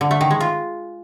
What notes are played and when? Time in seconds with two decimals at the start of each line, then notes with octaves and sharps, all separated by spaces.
0.01 D3
0.11 A3
0.21 D#3
0.31 G#3
0.41 F4